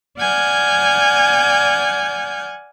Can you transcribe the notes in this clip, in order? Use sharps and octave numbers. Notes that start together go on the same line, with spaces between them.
D5 F#5 G#5 F6 G6 G#6